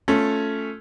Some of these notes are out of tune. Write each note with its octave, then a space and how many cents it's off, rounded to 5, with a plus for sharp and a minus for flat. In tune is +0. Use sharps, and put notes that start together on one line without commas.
A3 +0 C#4 +5 F4 +10